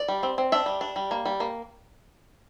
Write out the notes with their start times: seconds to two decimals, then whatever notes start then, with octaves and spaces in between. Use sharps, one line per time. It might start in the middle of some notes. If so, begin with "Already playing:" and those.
Already playing: D5
0.08 G3
0.23 C4
0.38 C4
0.52 D4 E5
0.66 G3
0.81 D4
0.96 G3
1.11 A#3
1.26 G3
1.40 A#3